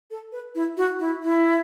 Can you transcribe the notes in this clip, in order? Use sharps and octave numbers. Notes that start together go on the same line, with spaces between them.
A4
B4
E4
F#4
E4
E4